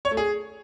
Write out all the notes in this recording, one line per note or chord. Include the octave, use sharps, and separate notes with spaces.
C#5
A3
G#4